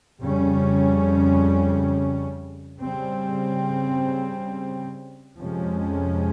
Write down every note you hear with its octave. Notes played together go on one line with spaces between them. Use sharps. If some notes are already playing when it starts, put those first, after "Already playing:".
F2 C#3 G3 C#4
C#3 G3 C4
F2 C3 F3 G#3 C#4